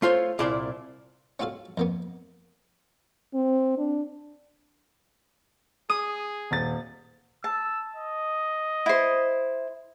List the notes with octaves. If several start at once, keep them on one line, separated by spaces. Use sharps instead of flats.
A3 F4 C5 C#5
C2 A#2 E4 D5 C6
C#4 F4 F#4 A4 F5
F2 A#3 B3
C4
D4
G#4 D#6
D#1 A6
A5 E6
D#5
E4 C5